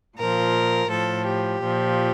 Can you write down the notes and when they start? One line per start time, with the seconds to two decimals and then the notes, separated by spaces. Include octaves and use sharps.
0.18 A#2 F3 A#4
0.90 A2 F3 A4
1.26 G4
1.62 A#2 F3